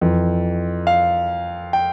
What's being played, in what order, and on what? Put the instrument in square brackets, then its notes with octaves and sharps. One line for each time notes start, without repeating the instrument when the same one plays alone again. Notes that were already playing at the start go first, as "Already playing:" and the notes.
[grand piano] F2 E3
F5
G5